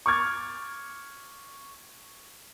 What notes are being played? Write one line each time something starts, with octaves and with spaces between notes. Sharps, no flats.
C#6 D6 F6 G#6 A6